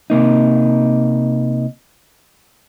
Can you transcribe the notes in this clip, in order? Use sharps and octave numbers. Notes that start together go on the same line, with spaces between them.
C3 A#3 D#4